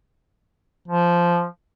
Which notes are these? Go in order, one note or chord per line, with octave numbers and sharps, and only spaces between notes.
F3